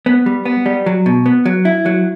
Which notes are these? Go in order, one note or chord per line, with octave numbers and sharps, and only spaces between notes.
B3
G3
B3
G3
F#3
B2
B3
F#3
E4
F#3